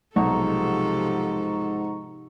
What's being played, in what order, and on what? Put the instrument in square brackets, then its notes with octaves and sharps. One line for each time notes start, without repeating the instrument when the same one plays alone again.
[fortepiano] B1 [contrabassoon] G#2 [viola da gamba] C3 F3 A4 [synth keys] F#5 A#5 C#6